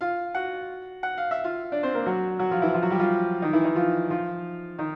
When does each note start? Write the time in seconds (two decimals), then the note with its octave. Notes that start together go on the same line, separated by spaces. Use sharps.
0.01 F4 F5
0.35 F#4 F#5
1.03 F#5
1.18 F5
1.31 E5
1.44 F4 F5
1.72 D4 D5
1.83 C4 C5
1.94 A#3 A#4
2.06 F#3 F#4
2.39 F#3 F#4
2.51 F3 F4
2.62 E3 E4
2.74 F3 F4
2.82 F#3 F#4
2.90 G3 G4
3.00 F3 F4
3.42 D#3 D#4
3.53 E3 E4
3.64 D#3 D#4
3.76 F3 F4
4.10 F3 F4
4.78 D#3 D#4